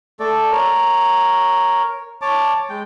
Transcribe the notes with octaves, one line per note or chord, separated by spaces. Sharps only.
A3 A4 D5
A#4 C#5
C#5 A5 D6
G#3 G5